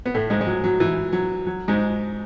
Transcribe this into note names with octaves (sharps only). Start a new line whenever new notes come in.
B3
A2 A3
G#2 G#3
G#3
F#3
F#3
E3
F#3
F#3
G#2 G#3